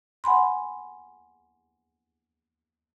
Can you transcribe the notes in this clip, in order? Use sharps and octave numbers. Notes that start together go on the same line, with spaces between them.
F#5 G#5 B5 C6